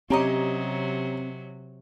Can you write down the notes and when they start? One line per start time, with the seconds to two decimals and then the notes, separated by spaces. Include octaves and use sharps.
0.10 C3 F#3 C4 C#4 G4 C#5 D#5 A#5